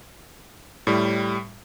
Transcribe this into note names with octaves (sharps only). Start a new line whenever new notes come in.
A2 G3